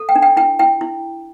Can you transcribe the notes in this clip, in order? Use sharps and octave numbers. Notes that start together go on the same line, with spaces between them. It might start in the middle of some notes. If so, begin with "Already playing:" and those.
Already playing: A4
G5
D4
G5
E4 G5
E4 G5
E4